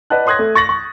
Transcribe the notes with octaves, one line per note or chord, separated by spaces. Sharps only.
B4 D5 D#5 F#5 A5 F#6
C#5 C6 D#6 F#6 G#6 A#6
A3
C#6 A6 A#6 F#7
C#6